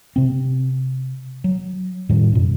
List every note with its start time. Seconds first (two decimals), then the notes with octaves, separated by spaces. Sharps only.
0.16 C3 C4
1.44 F#3
2.09 F2 A2 D#3 G3
2.32 F#2 B2